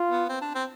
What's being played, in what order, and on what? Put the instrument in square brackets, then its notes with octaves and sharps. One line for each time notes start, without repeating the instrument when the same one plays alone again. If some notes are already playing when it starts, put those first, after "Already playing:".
Already playing: [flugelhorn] F4
[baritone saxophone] B3
C4
D4
C4